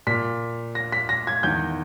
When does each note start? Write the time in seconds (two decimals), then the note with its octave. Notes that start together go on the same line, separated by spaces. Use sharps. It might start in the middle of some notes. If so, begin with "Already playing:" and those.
0.07 A#2 B6
0.75 A#6
0.92 B6
1.09 A#6
1.27 G#6
1.43 E2 D#3 G6